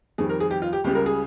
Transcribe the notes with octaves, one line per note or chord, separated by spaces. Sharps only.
F2 D#3 G3 G#4
A#4
G#4
G4
F4
G4
C#2 C#3 G3 G4
A#4
G#4